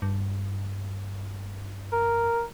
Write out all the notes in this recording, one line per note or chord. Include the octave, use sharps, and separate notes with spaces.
G2
A#4